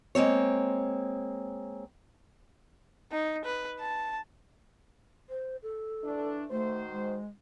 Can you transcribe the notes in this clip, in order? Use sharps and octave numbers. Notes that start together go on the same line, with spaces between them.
G#3 A#3 C4 C#5
D#4
B4
A5
C5
A4
E3 A3 D4
D#3 A3 F#4 C5
G#3